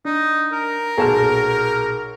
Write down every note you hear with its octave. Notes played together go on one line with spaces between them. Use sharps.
D4 D#4
A#4
B1 A#2 G#4 A5 F6